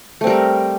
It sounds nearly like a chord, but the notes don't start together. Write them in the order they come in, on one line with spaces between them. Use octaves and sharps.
A3 C4 G3 A#4